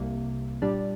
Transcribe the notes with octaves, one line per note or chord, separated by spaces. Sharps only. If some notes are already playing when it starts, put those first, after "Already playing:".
Already playing: C2 C3 A#3
A#2 G3 D4 G4 D5